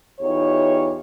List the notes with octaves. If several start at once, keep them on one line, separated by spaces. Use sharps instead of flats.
E2 D#4 F4 G4 C#5